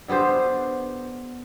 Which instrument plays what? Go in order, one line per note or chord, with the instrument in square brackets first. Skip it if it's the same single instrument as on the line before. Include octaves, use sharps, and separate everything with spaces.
[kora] D3 B3 G4 C5